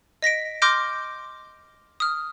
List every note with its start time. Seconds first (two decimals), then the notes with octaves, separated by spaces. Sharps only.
0.22 D#5 A#6 B6 D7
0.62 C6 D6 F6 G6 A#6 D7
2.00 D#6 F6